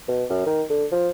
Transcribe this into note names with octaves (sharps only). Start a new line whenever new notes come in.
B2
F#2
D#3
D3
F3